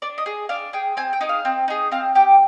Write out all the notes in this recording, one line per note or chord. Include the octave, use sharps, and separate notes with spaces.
D4 D5
D#5
G#4
D4 F5
G#4 G5
C4 G#5
G5
D#4 G#4
F5
C4
D#4 G#4
C4 F5
G4 G5